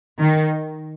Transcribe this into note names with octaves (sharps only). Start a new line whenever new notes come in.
D#3